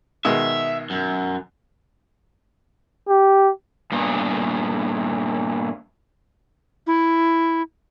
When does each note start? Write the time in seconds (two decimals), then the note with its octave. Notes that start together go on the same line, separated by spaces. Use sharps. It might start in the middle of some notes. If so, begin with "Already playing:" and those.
0.25 B2 D#3 G#3 E5
0.90 F#2
3.09 G4
3.92 G2 A#2 B3
6.87 E4